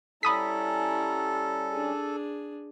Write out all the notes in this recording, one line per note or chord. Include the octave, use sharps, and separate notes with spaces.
G3 C#4 E4 A4 A#5 B5 D#6 B6
D4 G#4